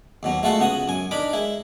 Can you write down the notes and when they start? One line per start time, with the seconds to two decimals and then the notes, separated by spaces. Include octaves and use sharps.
0.23 D#2 B2 F#3
0.43 G#3 A3 F4 F#4 A4 F#5
0.59 C#2 B3 F#4 D#6
0.88 F#2 G#5
1.11 D4 D#4 A#4 B5
1.33 G#3 E4